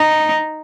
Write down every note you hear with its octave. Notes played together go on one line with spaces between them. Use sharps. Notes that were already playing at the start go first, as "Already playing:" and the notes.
Already playing: D#4